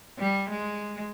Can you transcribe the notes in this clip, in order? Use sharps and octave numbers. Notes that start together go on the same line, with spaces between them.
G3
G#3